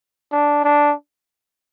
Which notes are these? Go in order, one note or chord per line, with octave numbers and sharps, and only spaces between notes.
D4
D4